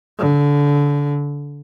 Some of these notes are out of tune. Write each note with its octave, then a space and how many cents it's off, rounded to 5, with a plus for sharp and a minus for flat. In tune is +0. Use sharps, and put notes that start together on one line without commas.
D3 -25